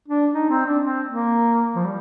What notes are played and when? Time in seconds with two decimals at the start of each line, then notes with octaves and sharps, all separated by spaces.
0.08 D4
0.34 D#4
0.50 C4
0.66 D4
0.84 C4
1.09 A#3
1.75 F3
1.84 G3